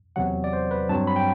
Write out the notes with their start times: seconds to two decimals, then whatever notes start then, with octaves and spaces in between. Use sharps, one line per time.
0.16 E2 C3 F#3 F#5
0.44 D5
0.53 C5
0.71 B4
0.89 G2 F#3 C4 A5
1.07 B5
1.16 G5